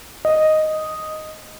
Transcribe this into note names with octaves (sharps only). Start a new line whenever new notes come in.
D#5